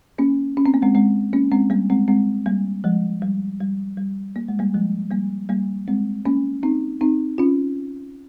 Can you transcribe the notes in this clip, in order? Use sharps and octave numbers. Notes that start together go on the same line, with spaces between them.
A#3 C#4
C#4
C4
A#3
G#3 C4
G#3 C4
A#3 C#4
G#3 C4
G3 A#3
G#3 C4
G#3 C4
G3 A#3
F3 G#3
G3
G3
G3
A#3
G#3
G3 A#3
F3 G#3
G3 A#3
G3 A#3
G#3 C4
A#3 C#4
C4 D#4
C4 D#4
C#4 F4